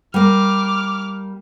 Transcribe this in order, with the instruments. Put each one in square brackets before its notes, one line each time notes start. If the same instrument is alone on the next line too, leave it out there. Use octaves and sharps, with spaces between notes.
[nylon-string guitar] G3 A#3 [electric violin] D6 F6